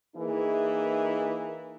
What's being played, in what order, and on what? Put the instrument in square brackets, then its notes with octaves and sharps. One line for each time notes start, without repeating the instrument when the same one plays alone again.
[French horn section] E3 A#3 D#4 E4 G#4